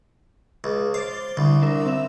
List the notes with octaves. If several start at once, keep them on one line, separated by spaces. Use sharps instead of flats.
C#2
C5 F5 D6 A6
C2 D3
D4 A#4 E5
C4 E5